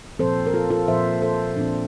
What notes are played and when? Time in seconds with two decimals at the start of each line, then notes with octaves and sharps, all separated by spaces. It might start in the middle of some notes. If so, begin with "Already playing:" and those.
0.19 A#2 F3 C4 A4 C5
0.47 A#4
0.53 F4 A4
0.70 F4 A4
0.88 A#2 F3 C4 C5 E5
1.22 A4 C5
1.57 A#2 F3 C4 D4